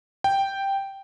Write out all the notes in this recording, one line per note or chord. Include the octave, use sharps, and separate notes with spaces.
G5